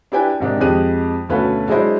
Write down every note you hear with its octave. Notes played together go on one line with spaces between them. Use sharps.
D4 E4 G4 B4 G5 G#5
G#2 C3 D#3 D4
F2 G#3 G4 F#6 D#7
D2 B2 A3 C#4 B4 F5
F#3 G#3 D4 E4 C5 D#5